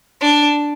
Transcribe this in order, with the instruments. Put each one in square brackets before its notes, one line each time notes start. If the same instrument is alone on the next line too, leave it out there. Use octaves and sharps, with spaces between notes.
[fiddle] D4